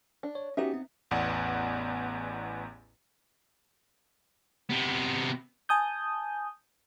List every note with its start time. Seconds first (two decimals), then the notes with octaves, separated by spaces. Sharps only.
0.23 D4
0.35 C#5
0.57 B3 C#4 D#4 F#4 G4 E5
0.74 C4
1.11 A1 E2 B3 D5 F#5
4.70 C3 B3
5.69 G#5 A5 D#6 G6